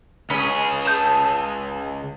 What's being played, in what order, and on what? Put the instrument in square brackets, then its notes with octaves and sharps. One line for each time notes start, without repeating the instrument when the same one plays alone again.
[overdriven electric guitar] C#2 G#4 [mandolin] C#4 B5
[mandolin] A5 D#6 G6